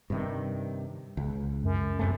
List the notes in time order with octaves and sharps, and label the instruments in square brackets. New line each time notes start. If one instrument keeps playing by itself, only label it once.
[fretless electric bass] G2 C3 D#3
C#2
[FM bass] F#2
[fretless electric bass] F#2 C3 A3